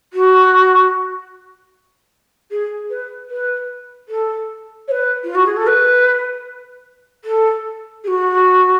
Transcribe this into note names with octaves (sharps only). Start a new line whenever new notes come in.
F#4
G#4
B4
B4
A4
C#5
B4
F4
F#4
G#4
A4
B4
A4
G#4
F#4